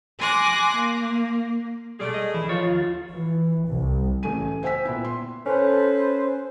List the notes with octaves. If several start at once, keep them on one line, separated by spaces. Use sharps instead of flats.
G#5 C6 D6 F#6 A#6
A#3
B1 G3 A3 G#4 D5
D#5
E3 E4
F3 F4 C#5
D#2
E3
C2
A1 C#3 A3 G#5 D#7
C5 E5 G5 G#5 E6 B6
A#2 B3 E4
C6
C#4 A4 B4 C5